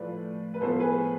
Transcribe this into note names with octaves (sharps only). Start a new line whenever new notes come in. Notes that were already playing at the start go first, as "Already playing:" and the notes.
Already playing: A2 F3 A3 B4 D5
B4
A2 F3 B3 A4 C5
G#4 B4